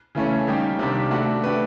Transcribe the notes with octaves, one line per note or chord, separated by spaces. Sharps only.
C#3 E3 A3 C#4
D#3 G3 A#3 D#4 G4
C3 D#3 G3 A#3 D4
A3 D4 F#4
A3 D4 G4 B4